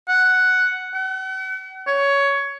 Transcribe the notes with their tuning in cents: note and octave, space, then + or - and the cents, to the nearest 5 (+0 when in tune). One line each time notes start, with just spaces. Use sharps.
F#5 +0
F#5 +40
C#5 +15